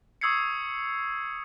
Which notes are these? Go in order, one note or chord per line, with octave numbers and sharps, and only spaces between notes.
C#6 D#6 E6 G#6 C7 C#7